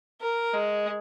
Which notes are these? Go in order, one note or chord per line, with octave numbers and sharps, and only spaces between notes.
A#4
G#3